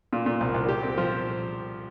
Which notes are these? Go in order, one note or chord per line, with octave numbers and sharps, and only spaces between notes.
A#2
A#2
C2
C2
G4
C4
F3